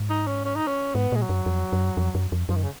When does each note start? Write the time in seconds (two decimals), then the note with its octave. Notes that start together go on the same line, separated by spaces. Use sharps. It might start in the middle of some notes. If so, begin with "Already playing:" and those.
Already playing: G#2
0.10 D#4
0.27 C#4
0.45 C#4
0.56 D#4
0.67 C#4
0.95 G#2 B3
1.12 A#2 G#3
1.21 F#3
1.29 F#2
1.46 F2
1.72 F#2
1.97 F2
2.15 F#2
2.32 F2
2.49 F#2 F3
2.56 D#3
2.63 C#3